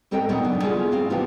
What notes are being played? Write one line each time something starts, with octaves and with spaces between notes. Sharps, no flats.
G#2 C4 A4 A#4 D#5 G5
D#2 A#2 D#3 F#3 B3 C4
C#3 D4
G3 B3 C#4 E4 F4 G#4
G#2 C4 F5
C3 E3 F3 B3 F4 G4